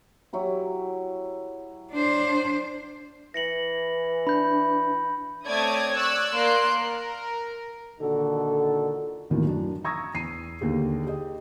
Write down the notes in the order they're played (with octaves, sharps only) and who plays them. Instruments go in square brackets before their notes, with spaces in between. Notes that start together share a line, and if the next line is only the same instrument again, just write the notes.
[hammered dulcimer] F#3 E4 G4
[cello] D4 C5
[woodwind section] E3 [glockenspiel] A#6 C#7 F#7
[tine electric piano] D4 [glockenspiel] B5 G6
[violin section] A3 C4 C#5 D5 D#6 G#6
D5 C#6 E6 F#6 G#6
A#3 D5 C6 F#6 D7
A#4
[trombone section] A#2 D3 D#3 D#4 F#4 A4
[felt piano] A1 D#2 B2 D#3 E3
F#2 D4
A#5 C#6 D#6 E6 G#6 A#6
E2 C7 D#7
D#2 D3 G4 G#4
G4 G#4 D#5